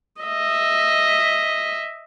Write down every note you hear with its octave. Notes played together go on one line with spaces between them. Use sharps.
D#5 E5